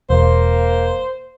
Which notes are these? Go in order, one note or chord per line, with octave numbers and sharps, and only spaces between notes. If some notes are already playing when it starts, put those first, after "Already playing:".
E1 A#3 C5